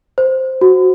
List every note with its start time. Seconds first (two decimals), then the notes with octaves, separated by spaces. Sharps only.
0.18 C5
0.61 F#4